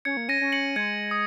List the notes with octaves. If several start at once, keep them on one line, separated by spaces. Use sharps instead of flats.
C#4 G#6 C#7
A#3
C#4 A#6 D#7
C#4
C#7 F#7
G#3 G#6 C#7
D#6